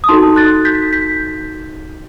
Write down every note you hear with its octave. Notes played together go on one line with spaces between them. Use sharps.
D#6
D#4 F#4 A4 A5 C6
F#6 A6
G6 B6
G6 B6